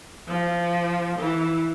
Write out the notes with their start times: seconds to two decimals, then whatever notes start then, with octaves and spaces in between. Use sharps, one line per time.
0.28 F3
1.18 E3